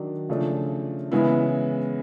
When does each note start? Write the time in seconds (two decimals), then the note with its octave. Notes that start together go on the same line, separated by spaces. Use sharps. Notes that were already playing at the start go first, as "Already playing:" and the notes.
Already playing: D#3 F#3 D4
0.29 C#3 F3 A3 D4
1.12 C#3 E3 G#3 B3 E4